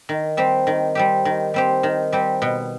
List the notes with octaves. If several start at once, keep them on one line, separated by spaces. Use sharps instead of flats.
D#3
G3 C4 G4
D#3
G3 C4 G4
D#3
G3 C4 G4
D#3
G3 C4 G4
B2